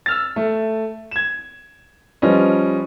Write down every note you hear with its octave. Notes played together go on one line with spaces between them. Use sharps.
E6 F6 A6
A3
G#6 E7
F3 G3 C#4 F4 B4 D#5